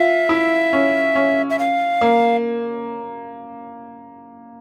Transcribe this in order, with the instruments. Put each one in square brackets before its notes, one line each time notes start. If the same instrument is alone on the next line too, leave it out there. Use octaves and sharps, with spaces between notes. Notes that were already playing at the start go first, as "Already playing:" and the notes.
Already playing: [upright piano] F4 [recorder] E5
[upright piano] E4
C#4
C#4
[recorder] E5
F5
[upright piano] A#3